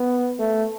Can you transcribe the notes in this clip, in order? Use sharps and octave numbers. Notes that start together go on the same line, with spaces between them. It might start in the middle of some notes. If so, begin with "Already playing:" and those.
Already playing: B3
A3